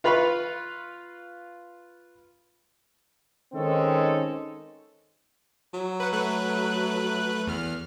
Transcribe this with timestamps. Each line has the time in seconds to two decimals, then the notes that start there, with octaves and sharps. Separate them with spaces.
0.04 F4 B4 F5 B5 C#6
3.54 D#3 G#3 C4 C#4 A4
5.74 F#3
6.00 B4 F#5
6.13 A3 B4 F#6
7.47 E2 F6